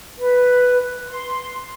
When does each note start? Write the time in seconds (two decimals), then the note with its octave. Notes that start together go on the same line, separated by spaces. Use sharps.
0.19 B4
1.09 C6